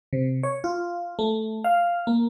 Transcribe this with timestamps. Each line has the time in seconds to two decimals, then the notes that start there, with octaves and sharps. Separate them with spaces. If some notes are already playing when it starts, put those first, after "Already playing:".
0.13 C3
0.43 C#5
0.64 F4
1.19 A3
1.64 F5
2.07 A#3